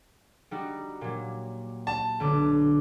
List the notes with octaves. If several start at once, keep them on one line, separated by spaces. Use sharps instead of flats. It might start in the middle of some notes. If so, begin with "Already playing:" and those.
G3 D#4 F#4
A#2 F#3
A5
B1 D3 D6